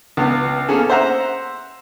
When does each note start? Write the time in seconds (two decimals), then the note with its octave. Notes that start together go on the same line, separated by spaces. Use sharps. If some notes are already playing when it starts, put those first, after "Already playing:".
0.17 C#2 B3
0.68 A#3 B3 C#4 G#4 A4
0.90 C5 E5 F#5 A#5